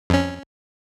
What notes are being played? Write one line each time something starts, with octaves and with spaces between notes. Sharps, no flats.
F2 C#4